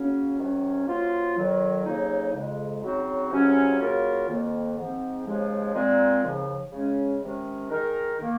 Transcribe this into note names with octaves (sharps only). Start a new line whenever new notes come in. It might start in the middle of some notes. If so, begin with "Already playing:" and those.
Already playing: C#3 F#3 A#3 C#4
C3 D#3 F#3 C#4 F#4
F#2 F3 A#3 F4
F2 D#3 F#3
F2 C#3 F#3 A#3 D#4
F2 C#3 G#3
C#3 F#3 C4 D#4 F#4
C#2 C3 F#3 C#4 F#4
C#3 F#3 A#3 F4 A#4
F2 D#3 A#3
G#2 F3 C4
D#2 C#3 F3 G#3
A#2 G#3 C4
D#2 C#3 F3
C#3 G#3 C#4
C3 D#3 G#3 C#4
D#3 G#3 D#4 A#4
D#3 A#3